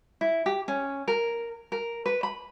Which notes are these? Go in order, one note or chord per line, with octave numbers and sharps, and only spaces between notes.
E4
G4
C#4
A#4
A#4
B4
B5